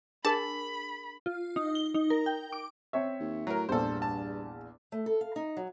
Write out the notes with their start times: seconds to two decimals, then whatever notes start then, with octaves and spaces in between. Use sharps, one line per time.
0.25 D4 G#4 A#4 A5 B5
1.26 F4
1.56 D#4
1.75 G7
1.94 D#4
2.10 A#4
2.26 G5
2.52 D6
2.93 C4 C#5 E5
3.20 D#2
3.47 A2 F#3 A#4
3.69 A#1 E2 G2 A4 C5
4.02 A5
4.92 A3
5.06 A4
5.21 F5
5.36 D#4
5.57 F#3